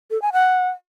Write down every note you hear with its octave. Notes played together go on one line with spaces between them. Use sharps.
A4
G#5
F#5